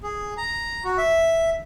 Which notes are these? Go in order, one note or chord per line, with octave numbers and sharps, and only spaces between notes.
G#4
A#5
F#4
E5